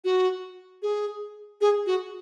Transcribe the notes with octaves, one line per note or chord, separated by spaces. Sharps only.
F#4
G#4
G#4
F#4